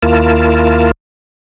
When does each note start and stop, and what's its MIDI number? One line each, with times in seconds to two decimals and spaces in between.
0.03 0.91 39
0.03 0.91 58
0.03 0.91 64
0.03 0.91 65
0.03 0.91 70
0.03 0.91 81